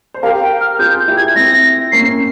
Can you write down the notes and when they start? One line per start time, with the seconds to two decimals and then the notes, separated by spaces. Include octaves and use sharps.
0.14 C5
0.23 G4 A#4 F5
0.42 G5
0.61 F6
0.79 F4 G#4 G6
0.99 G6
1.08 E4 G4
1.17 G#6
1.36 C4 E4 A#6
1.92 A#3 C#4 C7